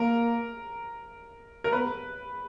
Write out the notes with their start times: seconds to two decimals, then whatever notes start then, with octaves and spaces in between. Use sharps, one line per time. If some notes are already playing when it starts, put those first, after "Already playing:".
Already playing: A#3 A#4
1.64 A#4
1.72 B3 B4